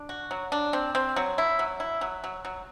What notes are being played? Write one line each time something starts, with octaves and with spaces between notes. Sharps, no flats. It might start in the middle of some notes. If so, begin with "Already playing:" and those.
Already playing: D4
F#4
F#3
D4
C4
C4
F#3
E4
F#3
E4
F#3
F#3
F#3